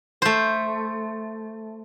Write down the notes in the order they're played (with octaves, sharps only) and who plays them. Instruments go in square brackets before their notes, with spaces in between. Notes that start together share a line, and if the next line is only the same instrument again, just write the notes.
[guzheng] A3 C5